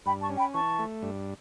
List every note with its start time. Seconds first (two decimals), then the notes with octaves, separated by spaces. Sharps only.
0.05 G2 G5 B5
0.22 A5 C#6
0.30 C#4
0.38 G5 B5
0.54 E3 A5 C#6
0.79 A3
1.03 G2